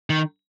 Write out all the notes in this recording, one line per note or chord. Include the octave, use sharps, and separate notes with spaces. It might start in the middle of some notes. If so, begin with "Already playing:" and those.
D#3